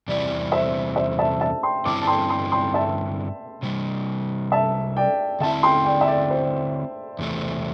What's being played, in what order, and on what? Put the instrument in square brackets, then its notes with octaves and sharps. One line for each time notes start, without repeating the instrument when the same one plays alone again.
[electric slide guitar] E2 C3 G3 C4 E4 [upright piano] D5
[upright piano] C5 E5
C5 E5
E5 A5
E5 A5
G5 C6
[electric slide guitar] G2 D3 C4 E4 [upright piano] A5 D6
[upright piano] A5
G5 C6
G5 C6
G5 C6
E5 A5
[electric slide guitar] C3 G3 D4
[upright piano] E5 A5
D5 G5
[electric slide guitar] D3 C4 E4 [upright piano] E5 A5
[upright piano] G5 C6
D5 G5
E5
D5
C5
[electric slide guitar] E2 C3 E3 A3 C4